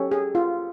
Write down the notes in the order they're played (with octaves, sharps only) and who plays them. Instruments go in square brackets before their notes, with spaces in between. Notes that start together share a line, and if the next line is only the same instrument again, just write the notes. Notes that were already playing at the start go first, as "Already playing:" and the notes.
Already playing: [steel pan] C#4 [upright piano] G4 A4
[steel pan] G#4
F4